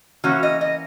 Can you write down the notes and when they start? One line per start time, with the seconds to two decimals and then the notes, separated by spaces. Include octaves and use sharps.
0.24 E3 A#3 C#4 F#4
0.43 D#5
0.61 D#5